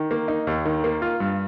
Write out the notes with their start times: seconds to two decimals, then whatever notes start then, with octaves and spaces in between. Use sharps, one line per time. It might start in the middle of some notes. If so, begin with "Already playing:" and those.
Already playing: D#3
0.11 A#3
0.28 D#4
0.47 D#2
0.65 D#3
0.84 A#3
1.02 F4
1.20 G2